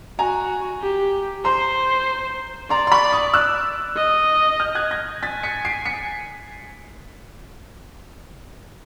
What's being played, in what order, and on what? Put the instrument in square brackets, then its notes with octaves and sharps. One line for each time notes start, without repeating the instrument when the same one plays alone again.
[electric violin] F#4 [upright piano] G#5 A#5
[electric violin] G4
[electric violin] C5 [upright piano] A#5 C6
[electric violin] D5 [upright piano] A#5 C6
[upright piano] C6
B5 C#6
C#6 D#6
E6 F#6
[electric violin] D#5
[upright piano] F6 G6
F#6 G#6
G#6 A#6
[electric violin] G#5 [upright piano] A6 B6
[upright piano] B6 C#7
C7 D7
B6 C#7